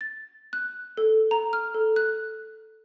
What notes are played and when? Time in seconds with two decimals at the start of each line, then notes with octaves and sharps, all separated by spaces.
0.01 A6
0.53 F#6
0.97 A4
1.31 A#5
1.53 F6
1.74 A4
1.96 F#6